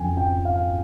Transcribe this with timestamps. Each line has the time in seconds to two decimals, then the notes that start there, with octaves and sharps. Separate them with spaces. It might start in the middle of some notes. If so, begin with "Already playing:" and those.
Already playing: F2 C#3 F3 G5 G#5
0.17 G5
0.45 F5